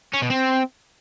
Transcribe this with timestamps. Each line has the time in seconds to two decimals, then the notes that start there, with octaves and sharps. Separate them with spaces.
0.13 C#4
0.22 B2
0.30 C4